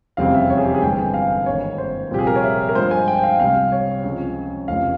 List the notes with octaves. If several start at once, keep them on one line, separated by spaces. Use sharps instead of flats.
F1 E2 C#3 G3 C4 F5
E5
C#5
G#4
G4
G#4
G1 G2 E3 G#3 C4 G5
G#5
F5
G#1 G2 E3 A#3 C#5
C5
C2 A#2 F3 C4 G4
G#4
A#4
C#5
E5
A#4
G2 F3 G#3 C5
G#5
G5
G5
F5
C2 C3 G3 F5
C#5
C#2 C#3 F3 C4
F1 F2 C#3 E3 G#3 F5